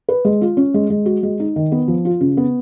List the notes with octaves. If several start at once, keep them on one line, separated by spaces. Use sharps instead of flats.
B4
G#3
F4
C#4
G#3
G#3
F#4
G#3
D#4
D#3
B3
F3
F4
C#3
B3